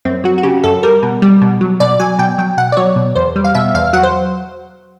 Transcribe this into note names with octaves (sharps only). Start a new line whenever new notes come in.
F#2 C4
F#3 F#4
F#4
C#3 G4
F#2 A4
G3 A#4
B2
G3
B2
F#3
B2 D5
F#3 G#5
B2 G5
F#3 G5
B2 F#5
D5
F#3 C#5
B2
E2 C5
G3
F5
B2 E5
E2 F5
F#3 F#5
C5